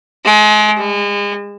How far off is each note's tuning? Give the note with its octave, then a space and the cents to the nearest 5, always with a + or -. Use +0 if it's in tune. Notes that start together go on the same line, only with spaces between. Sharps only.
G#3 +35
G#3 -35